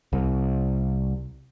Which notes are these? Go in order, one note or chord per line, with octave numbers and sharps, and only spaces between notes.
C2